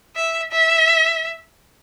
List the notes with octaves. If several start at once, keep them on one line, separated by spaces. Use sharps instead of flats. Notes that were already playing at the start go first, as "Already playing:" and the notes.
E5
E5